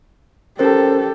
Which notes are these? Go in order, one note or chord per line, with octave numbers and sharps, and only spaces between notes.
C#4 G4 A4 A#4 C5